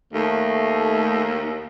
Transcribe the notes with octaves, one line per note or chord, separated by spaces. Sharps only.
D#2 A3